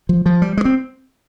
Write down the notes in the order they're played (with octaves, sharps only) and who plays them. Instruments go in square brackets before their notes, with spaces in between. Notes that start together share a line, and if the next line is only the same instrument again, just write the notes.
[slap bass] F3
F3
G3
G#3
C4